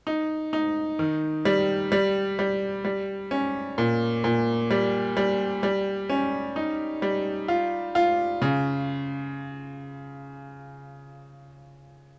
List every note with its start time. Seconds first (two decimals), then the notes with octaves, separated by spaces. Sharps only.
0.07 D#4
0.53 D#4
0.99 D#3
1.45 G3
1.92 G3
2.39 G3
2.85 G3
3.31 C#4
3.78 A#2
4.24 A#2
4.71 G3
5.17 G3
5.63 G3
6.10 C#4
6.56 D#4
7.02 G3
7.48 F4
7.95 F4
8.42 C#3